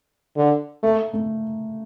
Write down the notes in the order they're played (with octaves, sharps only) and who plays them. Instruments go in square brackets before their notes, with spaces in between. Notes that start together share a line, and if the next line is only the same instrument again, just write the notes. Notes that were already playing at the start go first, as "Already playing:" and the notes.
[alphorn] D3
[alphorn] A3 [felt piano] A#3
[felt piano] A3